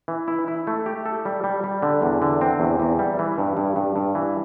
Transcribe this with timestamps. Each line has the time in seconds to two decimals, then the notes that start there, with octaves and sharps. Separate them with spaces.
0.08 E3
0.28 E4
0.48 E4
0.67 A3
0.86 G4
1.06 A4
1.25 G3
1.44 G3
1.64 G3
1.83 D3
2.02 E2
2.22 D3
2.41 C4
2.60 E2
2.80 E2
2.99 G3
3.19 E3
3.38 G2
3.57 G2
3.76 G2
3.96 G2
4.15 E3